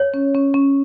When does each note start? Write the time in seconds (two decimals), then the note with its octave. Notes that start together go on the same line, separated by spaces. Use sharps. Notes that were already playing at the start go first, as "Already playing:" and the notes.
Already playing: C#5
0.14 C#4
0.35 C#4
0.54 C#4